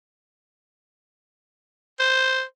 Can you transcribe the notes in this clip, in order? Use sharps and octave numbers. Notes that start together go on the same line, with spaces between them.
C5